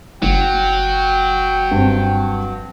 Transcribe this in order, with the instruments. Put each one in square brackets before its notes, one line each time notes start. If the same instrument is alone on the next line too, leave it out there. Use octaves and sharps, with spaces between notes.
[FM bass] F#1 [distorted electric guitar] F#3 [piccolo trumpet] G5
[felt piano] G2 C4